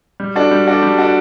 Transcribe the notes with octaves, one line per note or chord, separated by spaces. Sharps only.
G3
D4 F#4 A4 D5
G3
D4 F#4 A4 D5
G3
D4 F#4 A4 D5